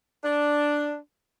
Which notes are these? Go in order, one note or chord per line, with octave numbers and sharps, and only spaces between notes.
D4